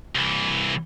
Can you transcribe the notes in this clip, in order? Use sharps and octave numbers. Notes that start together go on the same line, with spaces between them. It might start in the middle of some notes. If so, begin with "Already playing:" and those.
C2 E3